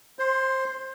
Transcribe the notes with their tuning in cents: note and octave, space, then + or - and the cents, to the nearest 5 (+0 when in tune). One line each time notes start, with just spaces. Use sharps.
C5 +20 C6 -5